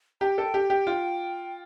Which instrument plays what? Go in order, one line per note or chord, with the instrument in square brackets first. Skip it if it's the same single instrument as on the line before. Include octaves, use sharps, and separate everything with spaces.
[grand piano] G4 [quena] G5 A#5
[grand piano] A4
G4
G4
F4